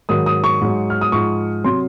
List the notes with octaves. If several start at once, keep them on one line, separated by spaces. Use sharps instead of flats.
G#2 D#3 F#3 D#6
D#6
C#6
G#2 F#3
F6
D#6
G#2 F3 C#6
C3 F#3 C6